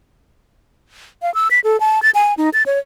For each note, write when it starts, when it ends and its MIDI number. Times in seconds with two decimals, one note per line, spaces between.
1.22 1.33 77
1.34 1.48 88
1.51 1.60 95
1.64 1.79 69
1.80 2.02 81
2.03 2.10 93
2.15 2.34 80
2.37 2.50 63
2.53 2.63 93
2.66 2.79 73